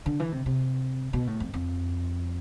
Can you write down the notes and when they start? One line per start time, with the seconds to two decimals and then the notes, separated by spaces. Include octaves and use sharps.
0.06 D3
0.20 E3
0.32 C3
0.46 C3
1.13 B2
1.27 A2
1.40 F2
1.54 F2